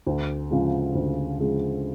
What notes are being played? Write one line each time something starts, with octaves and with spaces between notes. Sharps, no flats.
D2
C#3 F3 G#3
D2
C#3 F3 G#3